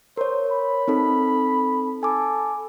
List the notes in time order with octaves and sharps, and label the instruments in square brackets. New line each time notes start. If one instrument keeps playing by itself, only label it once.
[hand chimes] A#4 C#5 [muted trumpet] C5
[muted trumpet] B5
[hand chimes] C4 D#4 A4
[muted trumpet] A4 [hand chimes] G#5 D6